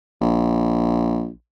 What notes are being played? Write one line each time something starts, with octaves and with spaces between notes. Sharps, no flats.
A#1